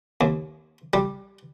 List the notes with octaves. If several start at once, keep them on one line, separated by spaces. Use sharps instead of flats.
D#2
G3